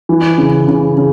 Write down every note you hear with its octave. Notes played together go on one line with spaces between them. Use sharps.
E3
C#3
C#3
C#3